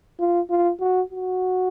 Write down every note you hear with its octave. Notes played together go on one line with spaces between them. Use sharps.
F4
F4
F#4
F#4